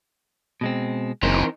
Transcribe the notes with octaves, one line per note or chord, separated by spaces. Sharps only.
B2 G#3 C4
F#1 E3 C4 D#4 A#4 C5